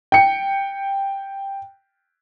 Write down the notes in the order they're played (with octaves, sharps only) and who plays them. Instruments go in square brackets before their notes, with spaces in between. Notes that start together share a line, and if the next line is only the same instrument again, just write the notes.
[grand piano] G5 C#7